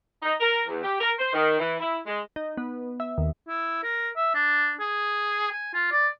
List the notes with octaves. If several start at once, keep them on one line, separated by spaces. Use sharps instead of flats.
D#4
A#4
E2
G4
A#4
C5
D#3
E3
E4
G#3
D#4
B3
E5
D#2
E4
A#4
E5
D4
G#4
G#5
F4
D5